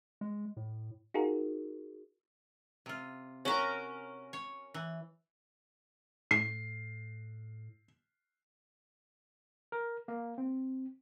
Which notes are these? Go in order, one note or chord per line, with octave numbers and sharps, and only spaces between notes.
G#3
A2
D#4 F4 F#4 G#4 A#4
C3 F4
C#4 F#4 A#4
C#5
E3
A2 C7
A#4
A#3
C4